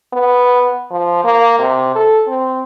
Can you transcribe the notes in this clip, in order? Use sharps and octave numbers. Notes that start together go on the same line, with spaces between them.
B3
F3
A#3
C3
A4
C4